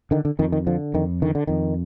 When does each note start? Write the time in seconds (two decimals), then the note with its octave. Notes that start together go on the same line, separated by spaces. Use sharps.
0.11 D3 D#3
0.25 D3
0.39 F2 D#3
0.52 D#3
0.67 D3 F3
0.94 F2 D#3
1.22 D3 D#3
1.35 D3
1.47 F2 D#3